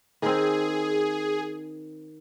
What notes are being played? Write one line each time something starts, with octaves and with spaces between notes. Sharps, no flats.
D#3 C4 G#4